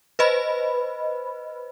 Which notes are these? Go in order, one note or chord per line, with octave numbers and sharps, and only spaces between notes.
B4 C5 D#5 B5